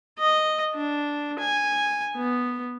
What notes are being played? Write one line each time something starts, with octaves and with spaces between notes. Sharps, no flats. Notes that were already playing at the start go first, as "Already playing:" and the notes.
D#5
D4
G#5
B3